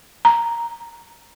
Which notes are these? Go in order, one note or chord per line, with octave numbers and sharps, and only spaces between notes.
A#5